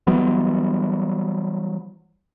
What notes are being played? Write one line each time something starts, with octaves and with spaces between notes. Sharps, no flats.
E3 F#3 G3 B3